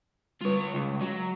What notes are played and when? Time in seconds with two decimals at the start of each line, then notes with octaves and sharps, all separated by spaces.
0.41 G3 F4 B4 C#5
0.74 C#2
1.01 F#3